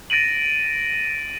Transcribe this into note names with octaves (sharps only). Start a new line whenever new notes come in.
A6 A#6 D7 D#7 F#7